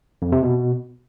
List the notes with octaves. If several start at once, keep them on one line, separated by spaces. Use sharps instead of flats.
F2
C3
B2